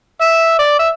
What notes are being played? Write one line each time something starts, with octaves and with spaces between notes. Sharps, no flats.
E5
D5
E5